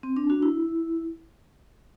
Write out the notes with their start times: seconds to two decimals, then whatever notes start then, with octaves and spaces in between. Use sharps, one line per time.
0.03 C4
0.17 D4
0.30 D4 F#4
0.43 E4